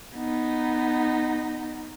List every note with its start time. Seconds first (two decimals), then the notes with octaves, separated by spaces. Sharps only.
0.16 B3 D#4